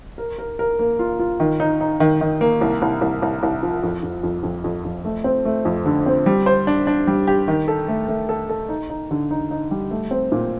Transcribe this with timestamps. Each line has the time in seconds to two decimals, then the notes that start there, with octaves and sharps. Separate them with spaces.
0.18 A#4
0.38 A#4
0.59 A#4
0.79 A#3
0.99 F4
1.19 F4
1.40 D#3
1.60 D#4
1.81 D#4
2.00 D#3
2.21 D#3
2.41 A#3
2.61 C2
2.82 C2
3.01 C2
3.22 C2
3.43 C2
3.63 F3
3.83 F2
4.03 F2
4.23 F2
4.43 F2
4.64 F2
4.85 F2
5.05 A3
5.24 C4
5.45 A3
5.65 F2
5.86 D3
6.06 C4
6.26 G3
6.46 C5
6.67 D4
6.87 D4
7.07 G3
7.27 G4
7.48 D#3
7.68 A4
7.88 A3
8.08 A3
8.29 A4
8.49 A4
8.69 D#4
8.90 D#4
9.11 D3
9.31 D#4
9.51 D#4
9.71 G3
9.91 A3
10.11 C4
10.32 A#2